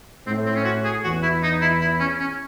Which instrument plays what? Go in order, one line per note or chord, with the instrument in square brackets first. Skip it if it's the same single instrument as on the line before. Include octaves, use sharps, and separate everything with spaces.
[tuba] A2 [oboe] C4
[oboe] C4
C#4
F#4
G#4
[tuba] E2 [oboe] F#4
[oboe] E4
D#4
E4
E4
C#4
C#4